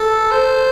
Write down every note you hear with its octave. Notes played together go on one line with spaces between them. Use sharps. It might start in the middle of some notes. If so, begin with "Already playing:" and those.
Already playing: A4
C5